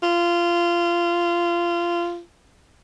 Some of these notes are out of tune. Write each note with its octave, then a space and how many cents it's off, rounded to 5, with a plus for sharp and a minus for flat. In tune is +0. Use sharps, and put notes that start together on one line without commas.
F4 -20